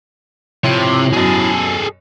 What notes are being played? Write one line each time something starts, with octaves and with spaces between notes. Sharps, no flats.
C3 F3 E4 C#5
F#2 B2 G#4 A4